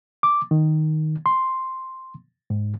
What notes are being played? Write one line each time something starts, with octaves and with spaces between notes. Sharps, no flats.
D6
D#3
C6
G#2